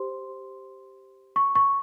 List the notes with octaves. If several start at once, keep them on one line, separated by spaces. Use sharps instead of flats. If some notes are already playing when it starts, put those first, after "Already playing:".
Already playing: G4 C5 C6
C#6
C#6